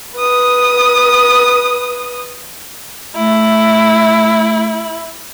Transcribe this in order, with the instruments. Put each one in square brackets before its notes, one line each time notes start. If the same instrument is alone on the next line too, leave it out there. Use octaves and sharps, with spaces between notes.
[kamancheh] B4 D#6
[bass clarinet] A3 [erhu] E4